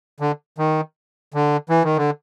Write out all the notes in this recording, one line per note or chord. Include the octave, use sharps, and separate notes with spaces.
D3
D#3
D3
E3
D#3
D3